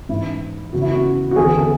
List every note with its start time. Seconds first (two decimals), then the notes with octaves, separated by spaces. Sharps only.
0.09 G#2 E3 E4
0.73 E2 C#3 E3 F#4
0.82 E4
0.91 F#4
1.31 F#4
1.36 E2 D3 G#4
1.58 A4